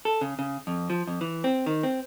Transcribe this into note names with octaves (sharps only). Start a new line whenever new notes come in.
A4
C#3
C#3
F2
F3
F2
E3
C4
D#3
C4